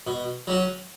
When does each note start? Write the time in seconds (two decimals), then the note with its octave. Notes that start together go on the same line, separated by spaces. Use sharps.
0.07 B2
0.47 F#3 C#4 F#4